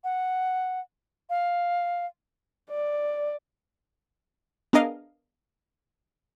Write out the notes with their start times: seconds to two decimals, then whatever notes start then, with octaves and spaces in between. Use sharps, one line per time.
0.04 F#5
1.30 F5
2.71 D5
4.73 B3 D4 G#4 A#4 D#5 F5